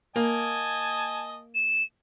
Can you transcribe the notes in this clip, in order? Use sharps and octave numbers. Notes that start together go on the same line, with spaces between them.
A#3 D#5 G#5 A5
E7